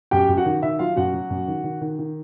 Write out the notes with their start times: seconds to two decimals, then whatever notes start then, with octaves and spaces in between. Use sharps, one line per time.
0.11 F#2 G4 G5
0.28 F#2
0.37 F#4 F#5
0.45 D#3
0.62 D#3 E5
0.79 F#3 F4 F5
0.96 F#2 F#4 F#5
1.14 F#3
1.30 F#2
1.48 D#3
1.64 D#3
1.81 D#3
1.99 D#3